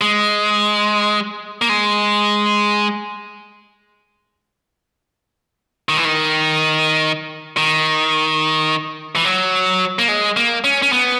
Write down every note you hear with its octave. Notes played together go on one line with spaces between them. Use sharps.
G#3
A#3
G#3
D#3
E3
D#3
D#3
E3
F#3
A#3
G#3
A#3
C#4
C#4
B3